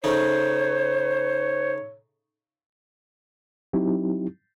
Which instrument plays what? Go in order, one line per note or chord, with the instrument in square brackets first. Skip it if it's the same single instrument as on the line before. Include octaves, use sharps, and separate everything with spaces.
[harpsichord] C#3 A3 D#4 [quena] C5 [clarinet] C#5
[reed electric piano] F#3 C4 D#4 E4 G4